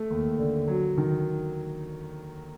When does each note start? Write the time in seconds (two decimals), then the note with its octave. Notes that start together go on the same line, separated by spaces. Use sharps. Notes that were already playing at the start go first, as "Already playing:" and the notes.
Already playing: A3
0.10 D#2
0.38 D3
0.68 F#3
0.98 D#3